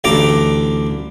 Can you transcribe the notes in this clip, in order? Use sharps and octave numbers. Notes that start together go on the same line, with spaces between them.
A1 D2 A4 G5 A#5 D6